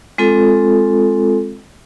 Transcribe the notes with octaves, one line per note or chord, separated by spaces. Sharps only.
G#3 C4 F4 A4